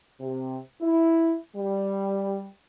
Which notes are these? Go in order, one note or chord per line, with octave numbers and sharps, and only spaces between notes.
C3
E4
G3